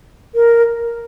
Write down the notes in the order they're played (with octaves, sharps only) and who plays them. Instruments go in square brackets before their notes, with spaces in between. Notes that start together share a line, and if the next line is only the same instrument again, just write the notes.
[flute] A#4